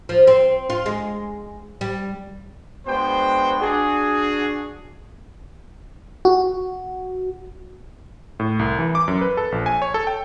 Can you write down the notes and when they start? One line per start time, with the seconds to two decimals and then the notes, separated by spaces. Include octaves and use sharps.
0.09 F3
0.27 C4
0.70 F4
0.86 G#3
1.81 G3
2.87 G#3 B3 D4 F#4 C5 G5
3.61 D4 F#4 G#4
6.25 F#4
8.40 A2
8.59 C2
8.79 E3
8.95 D6
9.08 F#2
9.21 B4
9.37 A4
9.52 A#1
9.66 G#5
9.82 C#5
9.94 A4
10.07 G5